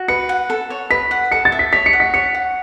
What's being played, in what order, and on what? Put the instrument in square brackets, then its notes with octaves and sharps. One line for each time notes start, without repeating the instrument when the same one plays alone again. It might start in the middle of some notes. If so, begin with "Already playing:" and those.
Already playing: [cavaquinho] F#4
[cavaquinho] B4 [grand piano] C#7
[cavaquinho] F#5
A4
C#5
[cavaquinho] B4 [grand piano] B6
[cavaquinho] F#5
[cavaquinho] A4 [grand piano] C#7
[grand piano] A6
[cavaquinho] E5
[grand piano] B6
[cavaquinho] C#5 [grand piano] B6
[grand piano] C#7
[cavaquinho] F#5
[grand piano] B6
[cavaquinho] C#5 [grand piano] C#7
[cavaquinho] F#5